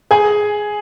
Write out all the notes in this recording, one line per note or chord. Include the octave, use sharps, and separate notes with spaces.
G#4 G#5